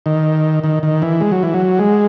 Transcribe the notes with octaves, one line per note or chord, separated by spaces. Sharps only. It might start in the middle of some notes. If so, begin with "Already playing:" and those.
D#3
D#3
D#3
E3
G#3
F#3
E3
F#3
G#3